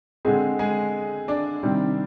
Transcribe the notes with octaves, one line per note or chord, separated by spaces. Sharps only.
D3 G#3 C4 G#4
G#3 G#4
D4 D5
C3 D#3 G3 C4